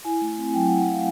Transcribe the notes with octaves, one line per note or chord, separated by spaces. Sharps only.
E4 G#5
A3
C4
F#3 G5
F#5
E4
F#5
A3 F5